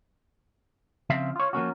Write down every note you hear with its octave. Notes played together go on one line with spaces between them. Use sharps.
C#3 F3 C4 E5 F5
F4 C#5
F3 A#3 C#4 F#4